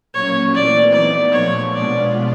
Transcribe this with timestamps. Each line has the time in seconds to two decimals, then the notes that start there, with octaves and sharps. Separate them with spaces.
0.13 A#2 F#3 A#3 C#4 C#5
0.54 E3 A3 C4 D5
0.93 F#3 B3 D#4 D5
1.32 A#2 F3 A3 C#5
1.73 B2 G#3 B3 D4 F4 D5